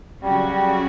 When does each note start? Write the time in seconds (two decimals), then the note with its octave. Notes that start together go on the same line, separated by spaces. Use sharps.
0.23 C#3 F#3 G3 C#4 F#4
0.52 G3